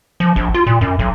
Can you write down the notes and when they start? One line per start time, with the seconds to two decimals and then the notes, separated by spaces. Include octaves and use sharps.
0.20 F3
0.36 A#1
0.54 F4
0.67 A#2
0.81 F#2
0.99 B1